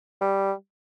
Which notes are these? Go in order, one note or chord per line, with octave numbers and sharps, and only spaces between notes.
G3